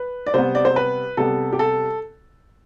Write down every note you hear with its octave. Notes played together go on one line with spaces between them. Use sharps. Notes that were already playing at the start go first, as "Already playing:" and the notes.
Already playing: B4
D5
C3 G3 B3 C5
D5
C5
B4
C3 G3 B3 A4
G4
A4